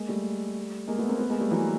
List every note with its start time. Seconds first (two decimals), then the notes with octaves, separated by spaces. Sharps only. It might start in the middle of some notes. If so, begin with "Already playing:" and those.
Already playing: G#3 A#3
0.09 G3 A3
0.88 G#3 A#3
0.98 A3 B3
1.09 A#3 C4
1.19 A3 B3
1.30 G#3 A#3
1.40 G3 A3
1.51 E3 F#3